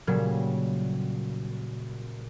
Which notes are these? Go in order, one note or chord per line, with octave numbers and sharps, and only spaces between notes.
A#2 C#3 F#3 G3